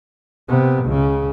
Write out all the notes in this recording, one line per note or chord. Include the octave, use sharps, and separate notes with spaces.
C3 B3
C#2 C#3